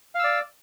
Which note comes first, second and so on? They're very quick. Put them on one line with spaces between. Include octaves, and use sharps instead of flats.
F5 E6 D5